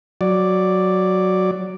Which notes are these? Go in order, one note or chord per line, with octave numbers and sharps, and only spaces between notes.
F#3 D5